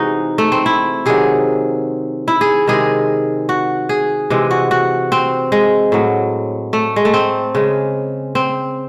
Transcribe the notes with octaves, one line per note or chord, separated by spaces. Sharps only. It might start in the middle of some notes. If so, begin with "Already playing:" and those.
Already playing: C3 E3 G#3 D#4 F#4 G#4
A3
C4
E4
C3 D#3 F#3 G#4
E4
G#4
C3 D#3 G#3 G#4
F#4
G#4
C3 E3 G#3
F#4
F#4
C4
G#3
A2 F#3
A3
G#3
A3
C4
C#3 G#3
C4